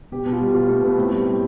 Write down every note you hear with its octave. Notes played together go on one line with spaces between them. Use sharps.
B2 G4
B2
F4
G3
B2 F4
B2 A3
B2 B3
A2 C4
G3
G3